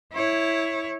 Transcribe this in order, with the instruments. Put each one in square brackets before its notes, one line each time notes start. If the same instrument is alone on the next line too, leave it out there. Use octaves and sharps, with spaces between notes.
[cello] E4 C#5